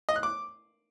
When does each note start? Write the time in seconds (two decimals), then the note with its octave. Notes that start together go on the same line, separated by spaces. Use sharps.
0.09 D#5
0.16 F#6
0.23 D6